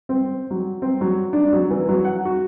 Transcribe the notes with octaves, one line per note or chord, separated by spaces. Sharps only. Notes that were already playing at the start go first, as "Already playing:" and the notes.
C4
F#3
C4
F#3
D4
F#3
E3
F#3
F#5
F#4